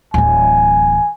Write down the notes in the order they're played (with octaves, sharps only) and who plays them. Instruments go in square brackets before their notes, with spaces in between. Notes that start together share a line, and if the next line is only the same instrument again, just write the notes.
[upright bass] D1 E3 [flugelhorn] G#5